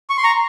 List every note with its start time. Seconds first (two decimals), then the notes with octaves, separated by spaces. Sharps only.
0.10 C#6
0.17 C6
0.23 A#5 C#6